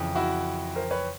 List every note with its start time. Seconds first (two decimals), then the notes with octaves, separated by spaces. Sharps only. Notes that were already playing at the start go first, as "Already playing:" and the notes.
Already playing: F2 C#3 E3
0.15 E4 F#4
0.76 A#4 C5
0.91 B4 C#5